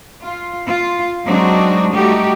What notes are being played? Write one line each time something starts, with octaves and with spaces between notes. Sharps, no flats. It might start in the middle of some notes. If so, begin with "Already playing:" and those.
F4
F4
F#3 G#3 C4 D4 D#4 F#4
G3 A3 D#4 F#4 G4